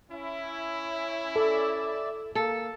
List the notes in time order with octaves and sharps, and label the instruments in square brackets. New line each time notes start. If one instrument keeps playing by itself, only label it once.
[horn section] C#4 E4
[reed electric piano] A4 [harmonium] D5 E5
[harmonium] A#3 [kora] A4